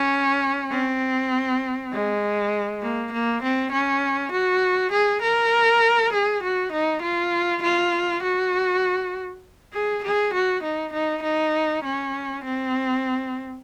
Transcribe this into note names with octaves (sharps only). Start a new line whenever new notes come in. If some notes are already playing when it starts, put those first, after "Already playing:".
Already playing: C#4
C4
G#3
A#3
A#3
C4
C#4
F#4
G#4
A#4
G#4
F#4
D#4
F4
F4
F#4
G#4
G#4
F#4
D#4
D#4
D#4
C#4
C4